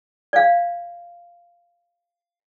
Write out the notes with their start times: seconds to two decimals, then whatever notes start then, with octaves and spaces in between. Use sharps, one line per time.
0.33 D5 F5